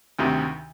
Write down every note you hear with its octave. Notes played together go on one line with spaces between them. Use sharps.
D2 C3 D#3